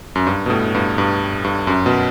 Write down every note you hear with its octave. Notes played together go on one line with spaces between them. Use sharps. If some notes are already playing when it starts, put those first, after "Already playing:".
F#2
G2
B2
A2
G2
G2
G2
F#2
B2